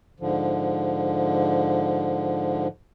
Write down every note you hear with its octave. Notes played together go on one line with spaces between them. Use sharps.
G#2 D3 F3